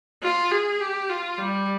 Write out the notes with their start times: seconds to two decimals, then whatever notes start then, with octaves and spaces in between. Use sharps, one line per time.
0.23 F4
0.51 G#4
0.80 G4
1.10 F4
1.38 G3